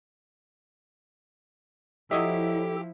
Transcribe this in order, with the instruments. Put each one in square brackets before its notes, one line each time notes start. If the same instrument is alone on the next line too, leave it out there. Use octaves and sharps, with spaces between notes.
[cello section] F3 E4 [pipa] F#3 D#5 E5 [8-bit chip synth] G4 [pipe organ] A4